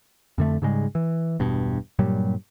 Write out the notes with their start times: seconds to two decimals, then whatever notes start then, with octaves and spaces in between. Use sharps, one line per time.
0.38 F2 D3 A3
0.62 G#2 C#3 G3 G#3
0.95 E3
1.39 E1 G2 B2
1.99 G2 A#2 F#3 G3